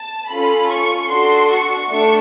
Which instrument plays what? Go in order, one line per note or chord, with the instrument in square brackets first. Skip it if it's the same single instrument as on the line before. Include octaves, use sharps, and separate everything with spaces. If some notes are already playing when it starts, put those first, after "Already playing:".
Already playing: [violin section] A5
C#4 F4 A4 B5
C#6
D4 F#4 A4 C6
C#6
A3 D4 C#6